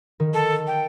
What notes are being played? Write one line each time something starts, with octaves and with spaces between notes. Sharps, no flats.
D#3
A4
G5